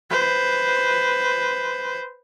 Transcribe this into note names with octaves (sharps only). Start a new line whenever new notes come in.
B4 C5